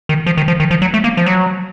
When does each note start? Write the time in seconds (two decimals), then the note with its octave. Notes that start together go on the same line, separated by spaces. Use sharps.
0.09 D#3
0.26 F3
0.37 D#3
0.48 F3
0.60 D#3
0.71 F3
0.82 F#3
0.94 A3
1.04 A#3
1.17 F3
1.26 F#3